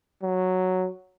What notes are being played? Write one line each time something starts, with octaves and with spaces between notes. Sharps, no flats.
F#3